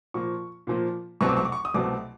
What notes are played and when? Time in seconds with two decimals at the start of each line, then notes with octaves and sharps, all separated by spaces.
0.14 A#2 F3 A#3 C#6
0.67 A#2 F3 A#3
1.21 C2 B2 F#3 A3 C4 C#6
1.29 D6
1.37 C#6
1.45 D6
1.52 C#6
1.65 D#6
1.74 C2 B2 F#3 A3 C4 D6